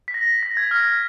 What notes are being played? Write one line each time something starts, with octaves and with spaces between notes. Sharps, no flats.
B6
A#6
A#6
G#6
F6